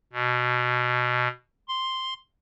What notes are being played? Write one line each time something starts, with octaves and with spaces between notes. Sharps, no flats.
B2
C6